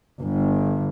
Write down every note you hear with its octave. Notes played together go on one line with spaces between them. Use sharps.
G1